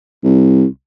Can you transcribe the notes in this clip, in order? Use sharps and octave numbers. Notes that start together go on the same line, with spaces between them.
C2